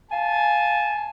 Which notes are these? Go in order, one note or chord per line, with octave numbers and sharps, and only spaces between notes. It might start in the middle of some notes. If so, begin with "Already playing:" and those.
F5 G#5 A5